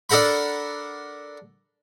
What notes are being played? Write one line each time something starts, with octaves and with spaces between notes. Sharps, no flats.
D4 A4 A#4 F#5 B5